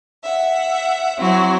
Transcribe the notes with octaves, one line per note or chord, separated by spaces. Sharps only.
E5 F#5
F#3 C4 E4 F#4